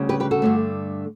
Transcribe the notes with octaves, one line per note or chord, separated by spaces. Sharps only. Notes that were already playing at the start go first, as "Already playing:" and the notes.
Already playing: D2 C#3 G3
G4 B4
G4 B4
F#4 A4
G2 D3 A3